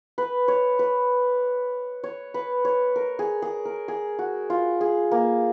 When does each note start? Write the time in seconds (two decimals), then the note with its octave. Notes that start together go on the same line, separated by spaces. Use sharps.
0.18 B4
0.48 C#5
0.79 B4
2.04 C#5
2.34 B4
2.65 C#5
2.96 A#4
3.19 G#4
3.42 G#4
3.65 A#4
3.88 G#4
4.19 F#4
4.50 F4
4.81 G#4
5.11 A#3